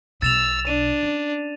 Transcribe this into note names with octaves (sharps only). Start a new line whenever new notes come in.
B1 B2 E6 A6 E7 F7
D4 D#7
C#4